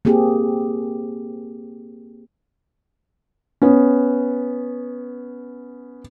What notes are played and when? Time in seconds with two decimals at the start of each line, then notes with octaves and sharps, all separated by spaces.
0.05 A#3 C4 G4 G#4
3.62 B3 C#4